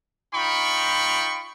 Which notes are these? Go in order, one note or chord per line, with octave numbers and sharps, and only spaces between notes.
D#4 F4 G5 B5 C#6